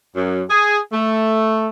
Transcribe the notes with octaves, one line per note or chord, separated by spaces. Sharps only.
F#2
G#4
A3